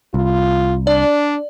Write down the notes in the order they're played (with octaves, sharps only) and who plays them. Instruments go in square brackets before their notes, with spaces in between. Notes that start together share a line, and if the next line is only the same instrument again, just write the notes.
[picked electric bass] C2 [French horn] F4
[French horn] D4 [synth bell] D5